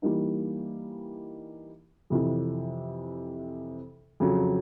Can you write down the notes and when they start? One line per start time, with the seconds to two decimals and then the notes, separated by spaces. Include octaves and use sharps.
0.02 E3 G3 A#3 D#4
2.10 F2 C3 E3
4.20 F2 C#3 F#3